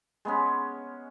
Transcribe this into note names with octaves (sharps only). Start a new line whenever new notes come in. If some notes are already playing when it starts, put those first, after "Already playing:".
G#3 B3 C#4